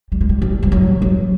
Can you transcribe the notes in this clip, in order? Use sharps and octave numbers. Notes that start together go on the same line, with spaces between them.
G3
G#3
G3
G3
F3
F#3
F#3